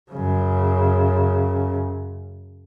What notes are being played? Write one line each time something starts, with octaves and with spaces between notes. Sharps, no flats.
F#2 C#3